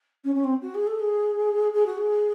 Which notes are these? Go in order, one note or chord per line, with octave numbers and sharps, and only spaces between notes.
C#4
C#4
C4
F#4
G#4
A4
G#4
G#4
F#4
G#4